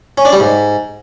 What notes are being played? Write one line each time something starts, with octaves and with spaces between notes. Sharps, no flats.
C#4
D4
G3
G#2